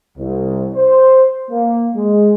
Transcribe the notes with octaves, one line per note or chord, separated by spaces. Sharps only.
C2
C5
A#3
G#3